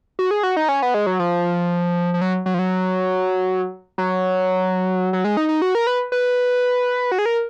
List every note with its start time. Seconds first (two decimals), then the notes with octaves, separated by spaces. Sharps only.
0.19 F#4
0.31 G#4
0.43 F#4
0.57 D#4
0.69 C#4
0.82 B3
0.94 G#3
1.07 F#3
1.19 F3
2.14 F3
2.21 F#3
2.46 F#3
2.54 F3
2.59 F#3
3.98 F#3
5.13 F#3
5.24 G#3
5.37 D#4
5.49 D#4
5.62 F#4
5.75 A#4
5.87 B4
6.12 B4
7.12 F#4
7.19 G#4
7.26 A#4